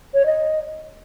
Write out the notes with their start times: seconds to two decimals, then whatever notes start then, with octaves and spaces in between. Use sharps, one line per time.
0.14 C#5
0.26 D#5